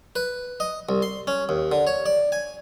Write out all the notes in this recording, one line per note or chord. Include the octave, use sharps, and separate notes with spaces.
B4
D#5
C2
C6
C#4
D#2
D3
C#5
D5
G#5